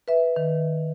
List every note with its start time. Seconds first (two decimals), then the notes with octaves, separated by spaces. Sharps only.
0.08 B4 E5
0.36 D#3